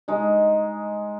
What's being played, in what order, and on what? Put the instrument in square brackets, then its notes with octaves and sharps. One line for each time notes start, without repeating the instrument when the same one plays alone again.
[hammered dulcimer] G#3 D#4